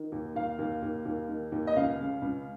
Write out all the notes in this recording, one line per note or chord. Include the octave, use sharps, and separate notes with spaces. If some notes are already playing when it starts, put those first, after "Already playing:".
Already playing: D#3
D#2
D#2 F5
D#2
D#2
D#2
D#3
D#2
D#5
C#2 F5
C#3
C#2